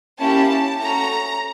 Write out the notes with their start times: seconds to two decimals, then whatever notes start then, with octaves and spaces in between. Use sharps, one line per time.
0.18 A#3 C#4 E4 G4 A5
0.80 A3 C#4 F#4 A4 A#5